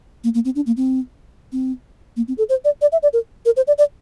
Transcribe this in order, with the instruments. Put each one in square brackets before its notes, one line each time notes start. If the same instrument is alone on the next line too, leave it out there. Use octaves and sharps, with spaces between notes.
[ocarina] A#3
A#3
C4
D4
A#3
C4
C4
A#3
C4
A4
C5
D5
D5
E5
D5
A#4
A#4
C5
D5
D5